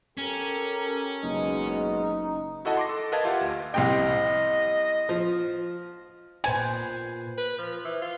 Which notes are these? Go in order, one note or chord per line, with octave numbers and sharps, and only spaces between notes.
C#4 G4 A4 A#4
F#1 B2 G#3 D#4
E4 F#4 A4 D#5 F#5 A5
C6 D6 A#6
A4
A#4 B4 D#5 F5 A5 G#6
F4 G4 E5 F#5
D2
C2 C3 D#5 G5
F3
A#2 B4 C5 G#5
B4
F3
E3
F4